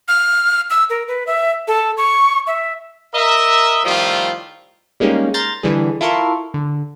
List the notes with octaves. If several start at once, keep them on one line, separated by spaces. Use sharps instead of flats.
F6
E6
A#4
B4
E5
A4
C#6
E5
A#4 D#5 E5
A2 D#3 F3 G3 A3 F4
G3 G#3 A#3 C#4 D#4 G4
A#5 C6 F6 G6 A6 A#6
D3 E3 G3 G#4
E4 F4 A4 A#4 C6 C#6
D3